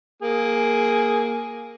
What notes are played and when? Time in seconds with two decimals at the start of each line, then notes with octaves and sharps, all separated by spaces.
0.22 A#3 G#4